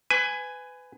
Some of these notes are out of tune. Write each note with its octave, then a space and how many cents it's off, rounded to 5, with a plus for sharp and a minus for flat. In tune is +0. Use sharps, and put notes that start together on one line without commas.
B4 +25 G#5 +0